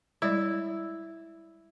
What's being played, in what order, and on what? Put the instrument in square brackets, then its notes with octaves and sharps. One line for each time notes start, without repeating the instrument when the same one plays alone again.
[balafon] G3 G#3 D5 [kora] E4